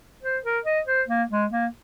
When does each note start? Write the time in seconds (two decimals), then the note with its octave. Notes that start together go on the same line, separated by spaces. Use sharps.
0.23 C5
0.44 A#4
0.65 D#5
0.87 C5
1.08 A#3
1.31 G#3
1.51 A#3